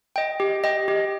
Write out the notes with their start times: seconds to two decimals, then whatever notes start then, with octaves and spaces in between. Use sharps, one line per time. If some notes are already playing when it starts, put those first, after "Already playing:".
0.16 D#5 G5
0.40 G4
0.64 D#5 G5
0.88 G4